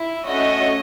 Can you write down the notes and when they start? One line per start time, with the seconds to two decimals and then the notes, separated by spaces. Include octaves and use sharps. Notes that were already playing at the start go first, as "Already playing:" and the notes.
Already playing: E4
0.25 A3 C#4 F#4 D#5